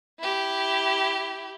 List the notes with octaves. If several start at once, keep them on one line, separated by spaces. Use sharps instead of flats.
E4 G4